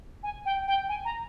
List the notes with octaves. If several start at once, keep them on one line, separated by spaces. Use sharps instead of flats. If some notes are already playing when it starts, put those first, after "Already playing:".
G#5
G5
G5
G#5
A#5